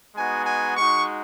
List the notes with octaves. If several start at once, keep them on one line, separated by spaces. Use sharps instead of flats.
G#3 B3 D#4 F#4 G#5
G#5
G#3 D#4 F#4 C#6